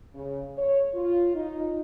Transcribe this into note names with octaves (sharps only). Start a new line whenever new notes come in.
C#3
C#5
F4
D#4